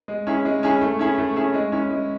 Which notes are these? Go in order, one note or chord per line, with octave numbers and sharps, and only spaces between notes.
G#3
C#4 E4 G#4
G#3
C#4 E4 G#4
A3
C#4 E4 G#4
A3
C#4 E4 G#4
G#3
C#4 E4
G#3